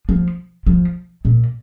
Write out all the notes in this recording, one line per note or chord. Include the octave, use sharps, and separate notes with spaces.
F3
F3
A#2